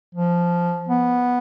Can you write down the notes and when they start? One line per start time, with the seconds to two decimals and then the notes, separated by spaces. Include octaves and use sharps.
0.15 F3
0.88 B3